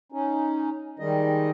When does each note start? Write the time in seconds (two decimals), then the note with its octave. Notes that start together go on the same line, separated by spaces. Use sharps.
0.12 C#4 D#4
0.99 D#3 G3 G#3 D#5